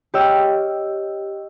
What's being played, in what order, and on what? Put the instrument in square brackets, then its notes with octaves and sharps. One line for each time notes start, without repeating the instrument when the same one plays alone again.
[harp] G4 C#5 D#5 G5 E6 F6